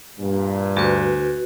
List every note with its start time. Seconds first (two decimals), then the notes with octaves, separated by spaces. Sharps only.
0.19 G2 A#2
0.77 D2 F#4 B4